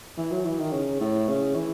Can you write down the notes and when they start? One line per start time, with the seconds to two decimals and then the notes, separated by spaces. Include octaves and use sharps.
0.18 E3
0.32 F#3
0.46 E3
0.59 D#3
0.73 C#3
1.00 A2
1.28 C#3
1.55 E3